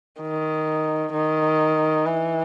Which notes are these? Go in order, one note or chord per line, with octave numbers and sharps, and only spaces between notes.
D#3
D#3
E3